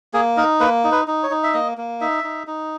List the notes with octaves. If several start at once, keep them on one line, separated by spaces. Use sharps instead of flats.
A#3 G#4
D#4 A#4
A#3 B4
D#4
B4
D#4
C#5
D#4
E5
A#3 D#5
A#3
D#4 E5
D#4
D#4